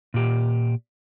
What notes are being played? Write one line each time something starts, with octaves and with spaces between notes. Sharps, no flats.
A#2 G4